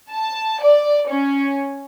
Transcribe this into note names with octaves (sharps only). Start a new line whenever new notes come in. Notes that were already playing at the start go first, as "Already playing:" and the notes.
A5
D5
C#4